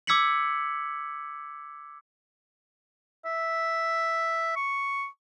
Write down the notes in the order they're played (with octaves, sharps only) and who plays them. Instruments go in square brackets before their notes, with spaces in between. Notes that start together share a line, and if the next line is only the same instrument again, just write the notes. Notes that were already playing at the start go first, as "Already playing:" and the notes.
[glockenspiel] D6 E6 G#6 B6 C#7 F#7
[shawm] E5
C#6